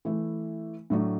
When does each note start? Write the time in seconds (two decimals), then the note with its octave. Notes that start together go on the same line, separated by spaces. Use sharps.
0.05 E3 A3 E4
0.90 A2 F#3 A3 D4